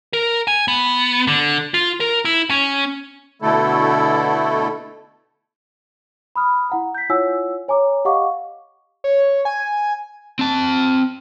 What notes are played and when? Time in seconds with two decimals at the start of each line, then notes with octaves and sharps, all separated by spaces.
0.13 A#4
0.47 G#5
0.68 B3
1.27 D3
1.74 F4
2.00 A#4
2.25 E4
2.50 C#4
3.42 B2 D3 A3 E4 A4
6.36 B5 D#6 F6
6.70 E4 F#5 A#5
6.95 G6 B6
7.10 E4 F4 C#5 F#5 G#5 E6
7.68 C#5 G#5 A#5 D6
8.05 G4 D#5 F5 F#5 C#6 D6
9.04 C#5
9.45 G#5
10.39 C4 A5